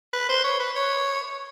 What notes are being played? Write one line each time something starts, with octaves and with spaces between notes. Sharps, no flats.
B4
C5
C#5
B4
C#5